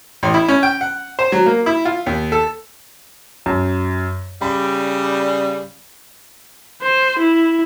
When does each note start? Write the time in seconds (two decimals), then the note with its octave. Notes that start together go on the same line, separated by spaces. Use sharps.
0.23 A1
0.34 E4
0.48 C#4
0.63 G5
0.81 F#5
1.19 C5
1.32 F#3
1.46 A#3
1.66 E4
1.85 F4
2.06 D#2
2.32 A4
3.46 F#2
4.42 C#3 G3 B5
6.82 C5
7.19 E4